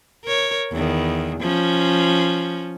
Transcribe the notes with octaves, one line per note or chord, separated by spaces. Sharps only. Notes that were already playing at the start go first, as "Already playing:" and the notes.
A#4 C#5
E2 D#3
F3 C#4